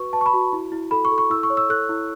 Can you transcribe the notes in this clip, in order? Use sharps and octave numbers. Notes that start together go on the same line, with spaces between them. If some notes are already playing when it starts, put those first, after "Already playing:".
Already playing: F#4 B4 C#6
B4 A5
C#6
B5
F#4
E4
E4
A4 B5
C#6
A4
C#6
E4 E6
C#6
C#5
E6
A4 F#6
E4